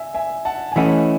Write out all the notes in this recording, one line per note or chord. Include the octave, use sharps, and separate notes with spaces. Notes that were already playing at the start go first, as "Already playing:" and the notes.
Already playing: E5 G#5
E5 G#5
F#5 A5
G#5
E3 A3 C#4 E4 D#5 F#5